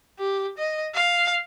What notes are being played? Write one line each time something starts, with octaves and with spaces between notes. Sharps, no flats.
G4
D#5
F5